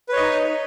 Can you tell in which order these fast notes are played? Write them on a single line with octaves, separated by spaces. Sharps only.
B4 C#5 D#5 D#4